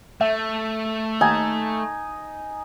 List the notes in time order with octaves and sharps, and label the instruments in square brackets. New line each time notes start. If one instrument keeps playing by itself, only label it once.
[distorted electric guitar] A3 [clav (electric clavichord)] E5
[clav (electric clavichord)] D#2 [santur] D#4 G#5